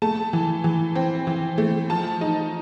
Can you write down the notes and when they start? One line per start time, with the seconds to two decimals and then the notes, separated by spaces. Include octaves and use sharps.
0.02 A3 A5
0.33 E3
0.64 E3
0.95 C4
1.27 E3
1.58 A3
1.90 F3 A5
2.21 D#4